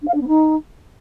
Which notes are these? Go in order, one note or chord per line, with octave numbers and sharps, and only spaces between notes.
D4
F5
D4
B3
D#4